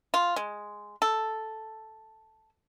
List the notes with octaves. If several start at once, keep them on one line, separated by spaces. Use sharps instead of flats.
F4
G#3
A4